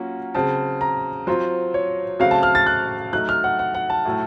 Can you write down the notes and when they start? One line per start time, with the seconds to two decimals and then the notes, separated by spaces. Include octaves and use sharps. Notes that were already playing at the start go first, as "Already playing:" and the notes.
Already playing: F#3 A#3 C#4 F4 F#5
0.35 C#3 F#3 C4 A5
0.81 A#5
1.27 F#3 C4 F4 C5
1.74 C#5
2.19 C#3 F#3 A3 C4 F#4 F5
2.31 A5
2.43 F6
2.55 A6
2.66 F#6
3.13 F#3 A3 D#4 F#6
3.29 F6
3.44 F#5
3.59 F#5
3.75 F#5
3.90 A5
4.05 A2 F#3 A3